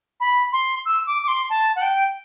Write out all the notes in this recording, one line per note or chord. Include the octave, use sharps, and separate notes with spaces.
B5
C6
E6
D6
D6
C6
A5
F#5
G5